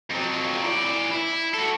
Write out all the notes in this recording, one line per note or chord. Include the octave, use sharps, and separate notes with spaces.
F2 F#3
E3 D5
E4
F#4 A4